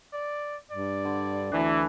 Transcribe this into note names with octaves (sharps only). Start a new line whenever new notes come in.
D5
G2 D5
D3
D2 E3 D4